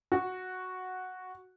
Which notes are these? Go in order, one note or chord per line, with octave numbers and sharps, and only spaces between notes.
F#4